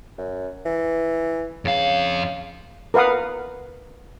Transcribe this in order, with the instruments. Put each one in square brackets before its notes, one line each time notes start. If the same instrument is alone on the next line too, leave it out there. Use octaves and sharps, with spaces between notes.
[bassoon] F#2
E3
[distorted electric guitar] F2 F5 [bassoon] C#3
[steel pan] A#4 B4 F5 F#5 D#6